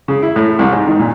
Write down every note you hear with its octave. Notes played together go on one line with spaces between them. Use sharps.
C#3
E4
A2
C2
G#2
D#3
A#2